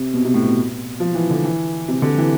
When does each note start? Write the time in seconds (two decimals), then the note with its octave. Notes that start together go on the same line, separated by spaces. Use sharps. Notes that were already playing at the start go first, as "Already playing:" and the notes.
Already playing: C3
0.14 B2
0.25 C3
0.34 A2
0.45 B2
1.00 F3
1.15 E3
1.30 D3
1.44 E3
1.88 C3
2.02 D3
2.18 E3